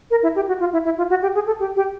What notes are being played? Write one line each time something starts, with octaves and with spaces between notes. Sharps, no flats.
A#4
E4
G4
F#4
F4
E4
E4
F4
F#4
G4
G#4
A4
G4
G4